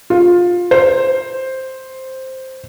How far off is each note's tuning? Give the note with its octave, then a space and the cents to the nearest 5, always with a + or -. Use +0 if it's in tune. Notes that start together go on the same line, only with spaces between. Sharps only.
F4 +15
C5 +5